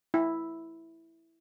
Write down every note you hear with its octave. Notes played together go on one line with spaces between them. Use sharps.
E4